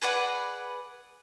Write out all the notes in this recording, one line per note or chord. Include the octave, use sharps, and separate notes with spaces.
G#4 B4 D5 F#5